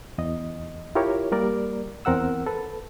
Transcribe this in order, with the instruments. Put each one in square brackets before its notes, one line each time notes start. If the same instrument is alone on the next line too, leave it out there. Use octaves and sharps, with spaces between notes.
[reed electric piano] E2 D#5
E4 F4 G4 A#4 C#5
G3 A#3 A#4 D5
E2 C4 A#4 F#5 E6
A4 B4